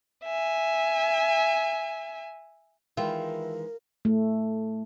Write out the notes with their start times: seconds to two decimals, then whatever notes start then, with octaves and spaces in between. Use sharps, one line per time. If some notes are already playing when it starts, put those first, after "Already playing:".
0.24 E5 G#5
2.97 D#3 E3 G#3 F4 A#4 E5 G5
4.05 A3